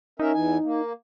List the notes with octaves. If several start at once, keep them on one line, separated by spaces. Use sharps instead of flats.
C#4 D#4 A#4 E5
E2 E3 G#5
A#3